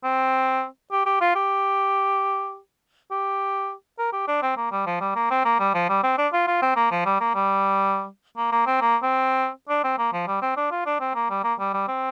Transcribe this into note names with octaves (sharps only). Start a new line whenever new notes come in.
C4
G4
G4
F4
G4
G4
A#4
G4
D4
C4
A#3
G3
F3
G3
A#3
C4
A#3
G3
F3
G3
C4
D4
F4
F4
C4
A#3
F3
G3
A#3
G3
A#3
A#3
C4
A#3
C4
D4
C4
A#3
F3
G3
C4
D4
F4
D4
C4
A#3
G3
A#3
G3
G3
C4